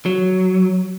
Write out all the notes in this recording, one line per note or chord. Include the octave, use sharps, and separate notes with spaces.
F#3